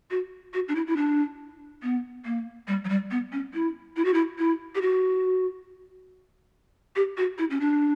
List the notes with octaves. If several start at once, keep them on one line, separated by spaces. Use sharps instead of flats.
F#4
F#4
D4
E4
E4
D4
B3
A#3
G3
F#3
G3
B3
C#4
E4
E4
F#4
E4
E4
G4
F#4
G4
F#4
E4
C#4
D4